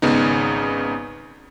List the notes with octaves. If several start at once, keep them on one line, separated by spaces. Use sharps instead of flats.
G#1 C#3 B3 D#4